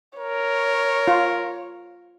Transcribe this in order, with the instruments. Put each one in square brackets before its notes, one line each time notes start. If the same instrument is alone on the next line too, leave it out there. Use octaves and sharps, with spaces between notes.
[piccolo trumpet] A#4 [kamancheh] C#5
[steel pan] F4